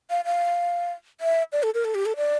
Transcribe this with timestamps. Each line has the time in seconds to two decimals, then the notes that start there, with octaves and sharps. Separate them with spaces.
0.10 F5
0.25 F5
1.20 E5
1.52 D5
1.63 A4
1.74 A#4
1.84 A4
1.95 G4
2.05 A4
2.17 D5